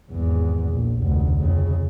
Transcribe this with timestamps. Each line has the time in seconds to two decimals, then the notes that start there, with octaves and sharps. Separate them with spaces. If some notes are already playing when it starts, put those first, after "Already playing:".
0.11 G#1 E2
0.70 A#1
1.00 F1 D2
1.38 F2 C#3